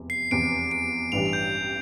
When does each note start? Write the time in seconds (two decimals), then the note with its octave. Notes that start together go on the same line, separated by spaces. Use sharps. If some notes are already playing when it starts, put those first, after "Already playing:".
Already playing: F1 E2 C3
0.10 C7
0.31 F1 E2 C3 D7
0.71 D7
1.12 A1 G2 E3 G3 D4 F7
1.33 G6